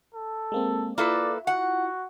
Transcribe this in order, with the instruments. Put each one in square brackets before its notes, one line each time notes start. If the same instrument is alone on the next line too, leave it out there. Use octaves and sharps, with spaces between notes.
[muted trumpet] A4
[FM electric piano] G#3 A#3 C4
[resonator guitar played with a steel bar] A#3 A4 B4 [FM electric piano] E4 F4 [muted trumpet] D5
[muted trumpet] F#4 [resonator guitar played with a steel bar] F#5